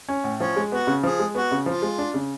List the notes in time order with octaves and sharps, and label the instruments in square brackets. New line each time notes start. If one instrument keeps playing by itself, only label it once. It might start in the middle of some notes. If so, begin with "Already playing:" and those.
[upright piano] C#4
A2
[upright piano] F3 [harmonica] C#4
[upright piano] G#3
[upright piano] B3 [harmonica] F#4
[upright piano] C#3
[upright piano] F3 [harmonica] G#4
[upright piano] G#3
[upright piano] B3 [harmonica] F#4
[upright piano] C#3
[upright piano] F3 [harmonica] F4
[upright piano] G#3
D4
C#3